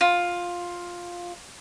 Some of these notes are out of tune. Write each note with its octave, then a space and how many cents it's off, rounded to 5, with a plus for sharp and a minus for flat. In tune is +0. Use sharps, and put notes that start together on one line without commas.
F4 +10